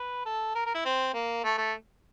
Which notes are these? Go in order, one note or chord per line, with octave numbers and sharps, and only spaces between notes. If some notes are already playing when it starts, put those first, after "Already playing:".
Already playing: B4
A4
A#4
A#4
E4
C4
A#3
A3
A3